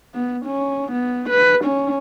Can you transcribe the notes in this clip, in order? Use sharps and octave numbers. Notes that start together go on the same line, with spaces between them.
B3
C#4
B3
B4
C#4